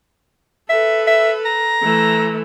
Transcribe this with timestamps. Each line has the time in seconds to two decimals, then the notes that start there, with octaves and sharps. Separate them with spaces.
0.70 A4 B4 E5
1.07 E5
1.46 A#5
1.82 E3 A3